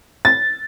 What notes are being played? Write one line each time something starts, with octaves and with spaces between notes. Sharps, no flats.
A6